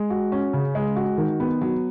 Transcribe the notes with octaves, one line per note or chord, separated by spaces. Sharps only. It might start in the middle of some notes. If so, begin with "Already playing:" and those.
Already playing: G#3
F#4
C#4
C#3
G#3
F#4
D#3
B3
F#3